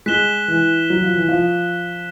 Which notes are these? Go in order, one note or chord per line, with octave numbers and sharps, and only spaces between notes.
G#3 F#6 B6 E7 G7
E3
F#3
F3
E3
F3